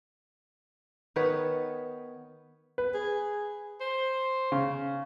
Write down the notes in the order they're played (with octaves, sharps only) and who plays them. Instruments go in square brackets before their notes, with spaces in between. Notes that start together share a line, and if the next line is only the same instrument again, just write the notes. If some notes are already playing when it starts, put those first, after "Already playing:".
[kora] D#3 B3 B4 C#5
[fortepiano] B4
[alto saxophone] G#4
C5
[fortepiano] C#3